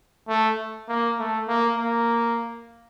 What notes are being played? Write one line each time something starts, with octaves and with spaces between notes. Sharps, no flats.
A3
A#3
A3
A#3
A#3